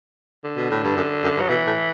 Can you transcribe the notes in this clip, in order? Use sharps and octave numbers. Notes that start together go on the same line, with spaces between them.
D3
B2
A2
G2
F#2
F#2
G2
F#3
B2 E3
A2